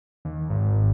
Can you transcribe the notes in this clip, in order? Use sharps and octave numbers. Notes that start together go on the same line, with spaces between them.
D#2
G#1